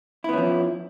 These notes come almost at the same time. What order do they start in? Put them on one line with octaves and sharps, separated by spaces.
E4 B3 C#4 F3